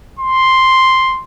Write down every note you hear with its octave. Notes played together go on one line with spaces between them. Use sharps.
C6